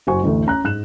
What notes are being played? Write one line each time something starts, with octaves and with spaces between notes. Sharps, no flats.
F#1 F#4 C5 G#5 C#6
A1 D2 A3
C#4 A#5 F#6
G#2 F#6 E7